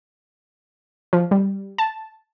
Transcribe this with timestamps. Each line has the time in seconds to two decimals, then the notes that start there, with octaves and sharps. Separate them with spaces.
1.13 F3
1.31 G3
1.78 A5